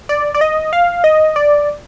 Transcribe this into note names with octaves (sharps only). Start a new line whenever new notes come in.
D5
D5
D#5
F5
D#5
D5